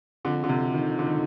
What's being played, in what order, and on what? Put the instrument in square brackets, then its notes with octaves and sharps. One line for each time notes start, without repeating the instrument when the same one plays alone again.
[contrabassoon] F2 [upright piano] D3
[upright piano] D3
C3
D#3
D3
D#3